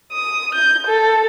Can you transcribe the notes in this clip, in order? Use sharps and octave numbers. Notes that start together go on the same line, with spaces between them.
D#6
G6
A4